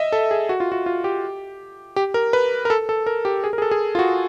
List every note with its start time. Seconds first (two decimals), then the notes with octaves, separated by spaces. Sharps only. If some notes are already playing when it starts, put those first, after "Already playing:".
Already playing: D#5 E5
0.12 A4
0.31 G#4
0.49 F#4
0.60 F4
0.72 F#4
0.86 F4
1.04 G4
1.96 G4
2.14 A#4
2.33 B4
2.65 A#4
2.70 A4
2.89 A4
3.06 A#4
3.25 G4
3.44 G#4
3.53 A#4
3.58 G#4
3.62 A4
3.71 G#4
3.95 F4
3.99 F#4